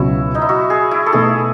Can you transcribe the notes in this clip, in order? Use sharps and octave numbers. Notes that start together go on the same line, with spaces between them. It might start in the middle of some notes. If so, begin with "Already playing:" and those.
Already playing: C#2 B2 F#3 C#4 E4 F#4
D#4
E4
F#4
G#4
E4
A4
B2 A3 D#4 G#4